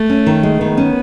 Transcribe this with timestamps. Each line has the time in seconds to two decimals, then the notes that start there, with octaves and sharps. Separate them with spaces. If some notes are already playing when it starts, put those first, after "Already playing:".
Already playing: A3
0.10 C#4
0.27 D#3
0.43 G#3
0.60 D#3 B3
0.77 C#4